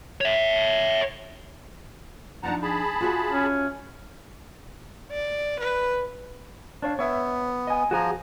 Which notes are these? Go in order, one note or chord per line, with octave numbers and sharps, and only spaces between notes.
C#5 E5
F3 D4 D#4 F#5 A5 A#5
G#4 A5 B5
F4 F#4 E5
C#4
D5
B4
D4 C#5 F5
B3 C#5 E5
D#5 G#5
F3 F#4 G#4 A#5